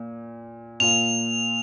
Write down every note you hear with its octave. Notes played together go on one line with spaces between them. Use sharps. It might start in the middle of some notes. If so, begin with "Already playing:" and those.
Already playing: A#2
A#2 A#3 F4 F7